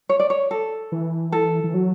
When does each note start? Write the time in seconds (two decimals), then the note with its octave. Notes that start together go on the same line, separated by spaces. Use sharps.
0.09 C#5
0.20 D5
0.30 C#5
0.51 A4
0.92 E3
1.32 A4
1.64 E3
1.74 F#3